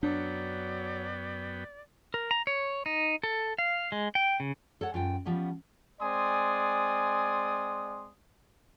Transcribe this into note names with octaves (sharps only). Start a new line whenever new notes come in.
F#2 F#3 B3 D4 D5 G5
A#4
A#5
C#5
D#4
A4
F5
G#3
G5
C#3
A4 C#5 F#5
F#2 F4 G5
F3 G3 B3 C#4
G#3 C4 D5 G#5 C6 D#6